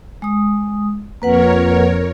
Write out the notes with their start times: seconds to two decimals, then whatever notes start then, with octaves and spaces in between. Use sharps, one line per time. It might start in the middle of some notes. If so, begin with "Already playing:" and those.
0.22 G#3 D#6
1.22 F2 A#3 A#4 B4 C#5 F#5